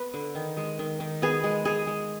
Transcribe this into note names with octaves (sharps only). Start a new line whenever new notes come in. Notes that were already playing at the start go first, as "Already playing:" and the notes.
Already playing: B3 B4
D3
D#3
G#3
D#3
D#3
B3 G#4
G#3
G#3 G#4
G#3